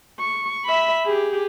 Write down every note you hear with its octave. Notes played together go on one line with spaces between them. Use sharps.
C#6
E5 B5
G4 G#4